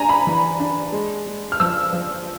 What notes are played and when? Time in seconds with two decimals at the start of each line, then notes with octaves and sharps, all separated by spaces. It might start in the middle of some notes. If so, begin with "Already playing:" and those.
Already playing: D4 G#5 A#5
0.09 B5
0.27 E3
0.60 D4
0.92 G#3
1.26 G#3
1.52 F6
1.60 F3 E6
1.92 F3